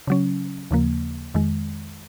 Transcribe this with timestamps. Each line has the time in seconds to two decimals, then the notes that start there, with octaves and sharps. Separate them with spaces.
0.07 C#3 F#3 C#4
0.71 D#2 C#3 F3 A#3
1.34 F2 D#3 G#3